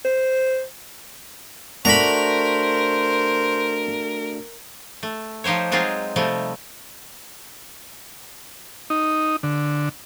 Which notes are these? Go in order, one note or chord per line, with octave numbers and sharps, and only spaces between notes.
C5
A3 D4 F#4 A#4 C5 A#5 B5
A3
F3 D#4 G4 C5 C#5
F#3 G#3 C4 D#4 F4 G#4
C3 F3 G3 A3
D#4
D3